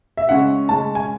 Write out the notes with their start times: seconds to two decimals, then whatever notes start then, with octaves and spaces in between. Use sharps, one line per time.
0.17 E5
0.29 C#3 G#3 C#4 F#5
0.69 C#3 G#3 C#4 A5
0.95 G#5